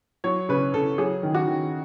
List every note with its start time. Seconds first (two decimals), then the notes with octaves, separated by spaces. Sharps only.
0.24 F#3 C#5
0.49 C#3 B4
0.74 C#3 A4
0.98 F#3 G#4
1.23 D#3
1.35 F#4
1.48 D#3